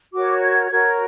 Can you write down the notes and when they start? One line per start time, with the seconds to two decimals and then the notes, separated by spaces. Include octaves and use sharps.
0.13 F#4 A#4 C#5 D6
0.42 G#6
0.70 F#4 A#4 C#5 G#6